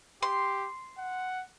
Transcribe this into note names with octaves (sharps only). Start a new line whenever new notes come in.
G4 C6
F#5